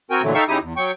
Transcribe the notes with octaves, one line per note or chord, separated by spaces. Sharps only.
C4 F#4 A#4 G5 G#5
A#2 D3 E3 F#3 A3
D#4 A4 E5 F5 G5 C#6
C#3 G#3 D#4 E4 G4 D#6
E2
F#3 G5 C#6